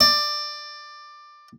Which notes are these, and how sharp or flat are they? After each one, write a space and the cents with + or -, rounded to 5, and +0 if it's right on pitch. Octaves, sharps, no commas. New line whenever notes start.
D5 +15